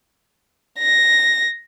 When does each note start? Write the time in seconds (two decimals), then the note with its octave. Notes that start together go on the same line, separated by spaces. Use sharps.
0.79 A#6